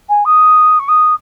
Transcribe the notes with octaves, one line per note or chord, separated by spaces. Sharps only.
G#5
D#6
C#6
D#6